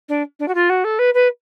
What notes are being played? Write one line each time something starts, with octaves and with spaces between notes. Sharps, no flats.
D4
D4
F#4
F4
F#4
A4
B4
B4